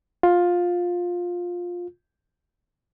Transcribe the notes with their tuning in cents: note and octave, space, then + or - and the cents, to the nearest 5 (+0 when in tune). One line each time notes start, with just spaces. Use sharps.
F4 +15